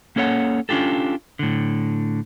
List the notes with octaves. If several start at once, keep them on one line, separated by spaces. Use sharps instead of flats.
A#3 C#4 A4 C#5 F#5
C#4 D4 F4 G4 A4
A2 D3